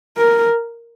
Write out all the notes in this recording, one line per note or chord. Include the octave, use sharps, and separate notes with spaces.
A#4